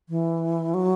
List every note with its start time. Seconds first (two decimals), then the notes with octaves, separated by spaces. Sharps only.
0.09 E3
0.74 F#3